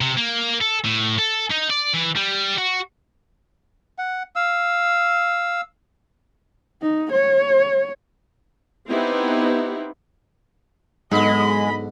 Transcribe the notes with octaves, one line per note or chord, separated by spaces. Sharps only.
C3
A#3
A4
A2
A4
D#4
D5
E3
G3
F#4
F#5
F5 E6
D#4
C#5
B3 C4 D#4 E4 G4
B1 G#2 D3 G#3 D#5 B5